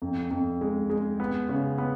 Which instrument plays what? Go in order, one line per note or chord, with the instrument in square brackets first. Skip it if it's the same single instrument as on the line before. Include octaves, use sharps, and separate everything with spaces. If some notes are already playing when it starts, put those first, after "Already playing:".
[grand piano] F2
F2
G#3
G#3
B3
C#3
B3